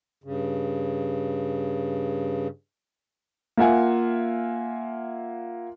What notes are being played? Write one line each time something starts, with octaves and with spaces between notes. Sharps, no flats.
G2 C#3
A#3 F4 E5 F#5 G#5